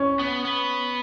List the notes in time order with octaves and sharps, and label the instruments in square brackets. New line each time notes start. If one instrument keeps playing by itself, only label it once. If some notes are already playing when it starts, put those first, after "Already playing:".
Already playing: [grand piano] C#4
[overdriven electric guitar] B3
B3